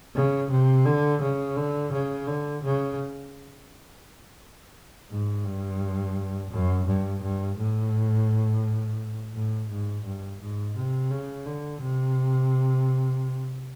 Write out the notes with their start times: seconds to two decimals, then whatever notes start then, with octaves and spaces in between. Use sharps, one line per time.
0.15 C#3
0.50 C3
0.85 D3
1.22 C#3
1.57 D3
1.93 C#3
2.28 D3
2.63 C#3
5.11 G#2
5.45 G2
6.51 F#2
6.87 G2
7.23 G2
7.57 A2
9.34 A2
9.69 G#2
10.05 G2
10.40 G#2
10.76 C3
11.11 C#3
11.46 D3
11.81 C3